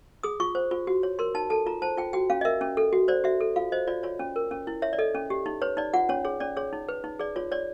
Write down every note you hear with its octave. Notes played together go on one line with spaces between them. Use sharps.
G#4 D#6
F4 C#6
C5
F4
F#4
C#5
A#4 C6
D#4 A5
A4 A5
F4 A#5
C5 A5
F4 G5
F#4 G5
C#4 F5
D#5
A#4 E5
C#4
A4
F#4
C5 D5
F#4 E5
A4
F4 F5
C5 D#5
F4 D5
F4 C#5
C#4
A#4
C#4
E4
C#5 E5
D5
A4 D#5
C#4
G4
D#4
B4 C#5
D#4 D5
F4 F#5
C#4 C#5
G#4 C#5
C#4 D5
G#4 C#5
D#4
B4
D#4
G#4 D5
F4 C#5
C#5 D5